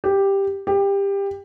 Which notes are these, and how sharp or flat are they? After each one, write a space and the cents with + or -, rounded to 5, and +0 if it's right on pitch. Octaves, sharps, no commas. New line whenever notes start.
G4 +5
G4 +20